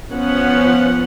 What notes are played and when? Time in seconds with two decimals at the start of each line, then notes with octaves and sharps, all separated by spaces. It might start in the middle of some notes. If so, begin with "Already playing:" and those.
0.12 F3 B3 C#4 F#5